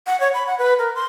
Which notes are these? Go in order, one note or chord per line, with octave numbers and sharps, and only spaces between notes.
F#5
C#5
B5
F#5
B4
A#4
C6